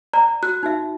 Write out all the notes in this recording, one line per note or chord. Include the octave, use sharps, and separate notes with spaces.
D5 A#5
F#4 F#6
D#4 F#4 E5